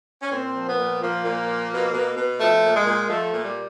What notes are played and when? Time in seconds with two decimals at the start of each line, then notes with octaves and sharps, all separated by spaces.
0.22 C#4
0.32 A#2 C4
0.55 F3
0.67 B3
0.79 A#2
1.01 F3 A#3
1.25 A#2
1.48 F3
1.71 B2
1.94 B2
2.16 B2
2.39 F3 A3
2.63 A#2
2.75 G#3
2.87 A#2
3.09 F3 A3
3.32 A#2
3.44 G3